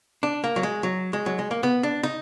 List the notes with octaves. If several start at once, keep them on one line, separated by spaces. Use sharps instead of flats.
D4
A#3
F#3
G#3
F#3
G#3
F#3
G#3
A#3
B3
D4
D#4